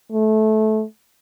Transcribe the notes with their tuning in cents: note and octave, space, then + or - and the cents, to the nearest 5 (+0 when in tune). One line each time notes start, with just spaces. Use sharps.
A3 -20